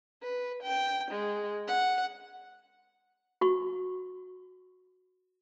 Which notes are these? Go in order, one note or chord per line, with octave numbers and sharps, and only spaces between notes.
B4
G5
G#3
F#5
F#4 C#6